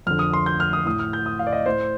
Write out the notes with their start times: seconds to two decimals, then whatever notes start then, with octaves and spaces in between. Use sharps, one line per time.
0.07 F2 D3 F6
0.19 D#6
0.34 C6
0.46 G6
0.60 F6
0.73 D#6
0.86 A2 D#6
0.99 F6
1.13 G6
1.26 D#6
1.39 F5
1.47 D5
1.52 D#5
1.66 A2 C5